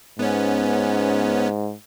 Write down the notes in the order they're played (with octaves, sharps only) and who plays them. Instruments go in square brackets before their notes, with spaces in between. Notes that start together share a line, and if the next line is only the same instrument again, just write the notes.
[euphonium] G#2 [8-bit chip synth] B3 C#4